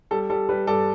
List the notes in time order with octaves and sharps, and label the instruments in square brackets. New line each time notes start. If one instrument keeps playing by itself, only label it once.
[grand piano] G3 A4
G3 A4
G3 B4
G2 A4 D5